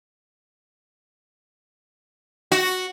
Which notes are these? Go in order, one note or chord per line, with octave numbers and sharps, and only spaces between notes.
F#4